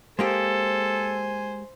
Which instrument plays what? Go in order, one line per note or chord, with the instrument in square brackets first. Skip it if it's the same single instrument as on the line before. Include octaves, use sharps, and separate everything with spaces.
[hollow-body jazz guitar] G#3 A#3 G4 [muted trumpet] A4 [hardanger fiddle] C5 [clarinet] G#5